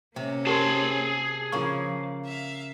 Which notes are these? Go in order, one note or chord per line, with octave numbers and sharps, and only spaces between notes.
C3 A#3 C#4
G4 G#4 A#4 A5 C6
C#3 F3 A#3 F4 C#6
E5 F5